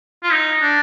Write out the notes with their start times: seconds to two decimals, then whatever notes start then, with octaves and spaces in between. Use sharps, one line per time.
0.23 F4
0.31 D#4
0.62 D4